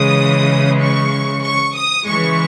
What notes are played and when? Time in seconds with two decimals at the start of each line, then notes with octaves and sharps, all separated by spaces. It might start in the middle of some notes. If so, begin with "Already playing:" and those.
Already playing: C#3 E3 G#3 D#6
0.81 C#6
1.43 C#6
1.74 D#6
2.05 C#3 E3 G#3 C#6